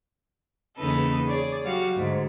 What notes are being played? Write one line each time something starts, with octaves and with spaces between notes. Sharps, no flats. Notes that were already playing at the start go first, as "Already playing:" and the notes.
E2 C#3 A#3 D#4 A4 B4
G#4 C#5 D5
F#3 G3 F#4 F5
D2 G#2